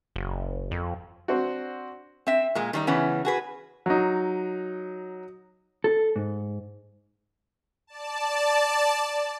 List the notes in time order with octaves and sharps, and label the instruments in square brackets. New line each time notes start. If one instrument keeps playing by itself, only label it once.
[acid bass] F#1
F2
[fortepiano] C4 D4 F#4
[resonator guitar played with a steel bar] C4 E5
A#2 G#3
D#3 G3 D#4
C#3 E3 B3 C#4
F#4 G#4 B4
[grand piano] F#3 D#4
[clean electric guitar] A4
G#2
[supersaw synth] D5 A5